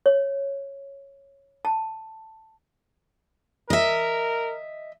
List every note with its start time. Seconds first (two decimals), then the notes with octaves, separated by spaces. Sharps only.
0.06 C#5
1.65 A5
3.70 A#4 D#5 E5